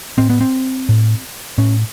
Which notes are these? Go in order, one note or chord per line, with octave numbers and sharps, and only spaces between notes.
A2 C4
B3
C4
A2
A2 C#4